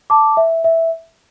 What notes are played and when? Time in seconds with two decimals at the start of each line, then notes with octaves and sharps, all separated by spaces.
0.10 A5 D6
0.37 E5
0.64 E5